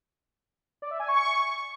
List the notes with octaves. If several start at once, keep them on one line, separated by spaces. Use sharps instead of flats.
D5
E5
G#5
C#6